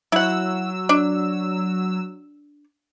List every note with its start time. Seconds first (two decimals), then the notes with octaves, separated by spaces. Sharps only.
0.12 F#3 E4 F#5 E6
0.89 D4